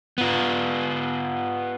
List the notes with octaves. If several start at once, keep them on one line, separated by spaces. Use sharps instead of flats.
B3 F4